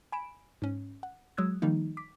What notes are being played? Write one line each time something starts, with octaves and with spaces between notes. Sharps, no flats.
G#5 B5 D7 E7
G#2 C#4
F#5
F#3 G#3 D#6 E6 F#6 G#6
D#3 F3 G3 A#3 D#4
D6 B6